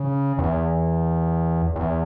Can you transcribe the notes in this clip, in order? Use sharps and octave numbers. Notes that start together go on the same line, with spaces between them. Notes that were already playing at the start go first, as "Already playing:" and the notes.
Already playing: C#3
E2
E2